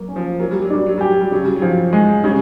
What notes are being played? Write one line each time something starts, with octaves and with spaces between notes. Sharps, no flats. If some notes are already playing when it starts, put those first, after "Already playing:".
Already playing: F#3 A#3
C#4
F3
F#3 A#3
G3
F#3
G3 D4
F#3
G3 G4
F#3
G3
C#3 F#3
G3
F#3
F3
G#3
C#3 G3